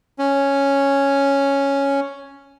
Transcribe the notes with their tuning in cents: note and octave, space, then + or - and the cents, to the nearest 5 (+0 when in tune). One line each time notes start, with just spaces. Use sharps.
C#4 +0